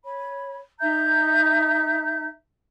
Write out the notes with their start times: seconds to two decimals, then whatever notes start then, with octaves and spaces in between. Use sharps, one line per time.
0.04 C#5 B5
0.80 D#4 E5 A#5 G6